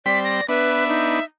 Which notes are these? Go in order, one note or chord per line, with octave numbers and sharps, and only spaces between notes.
G3 C4 D5 B6
A#6
B3 D4 B4 E5
D#4